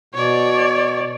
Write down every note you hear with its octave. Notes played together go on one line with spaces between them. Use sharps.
B2 C#5 D5